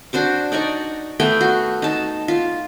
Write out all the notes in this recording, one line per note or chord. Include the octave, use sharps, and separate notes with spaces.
D4 F#4 C5 D6
D#4 D5 A#5 C#6
A3 B3 G5 C6
F#4
D#4 A5
F4